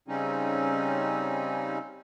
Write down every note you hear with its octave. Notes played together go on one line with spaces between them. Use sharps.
C#3 G3 C4 C#4 D#4